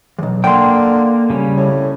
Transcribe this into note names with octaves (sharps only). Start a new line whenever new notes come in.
B1 E2
D3 A#3 G5 C6
C#3 G3 C#4
A2